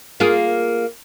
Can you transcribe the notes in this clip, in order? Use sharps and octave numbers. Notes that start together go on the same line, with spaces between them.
A#3 F4 G#4